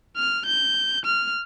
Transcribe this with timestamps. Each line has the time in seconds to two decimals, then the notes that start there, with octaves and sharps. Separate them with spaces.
0.16 F6
0.46 G6
1.05 F6